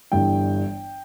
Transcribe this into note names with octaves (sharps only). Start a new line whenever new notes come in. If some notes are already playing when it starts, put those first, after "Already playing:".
G1 G2 E3 G3 G5